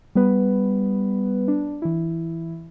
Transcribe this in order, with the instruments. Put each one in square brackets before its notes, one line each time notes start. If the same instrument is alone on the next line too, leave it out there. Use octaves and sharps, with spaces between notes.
[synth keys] G3 B3 B4
D4
E3 E4